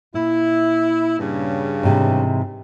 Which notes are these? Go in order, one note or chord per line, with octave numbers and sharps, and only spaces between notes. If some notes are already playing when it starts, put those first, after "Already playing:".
A#2 E4
G2 C#3
G#2 C3 E3